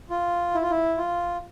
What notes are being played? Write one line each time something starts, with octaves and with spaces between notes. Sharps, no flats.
F4
E4
F4
E4
F4